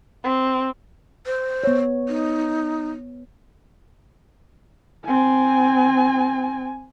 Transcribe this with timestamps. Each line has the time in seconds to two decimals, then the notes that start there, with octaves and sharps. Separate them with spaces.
0.24 C4
1.26 C5
1.64 B3 C#5
2.08 D#4
5.06 C4 G#5